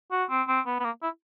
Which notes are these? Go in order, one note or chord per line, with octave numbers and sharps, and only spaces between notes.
F#4
C4
C4
B3
B3
A#3
E4